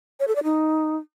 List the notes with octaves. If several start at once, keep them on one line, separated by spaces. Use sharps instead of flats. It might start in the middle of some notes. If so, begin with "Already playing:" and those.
C#5
A4
D5
D#4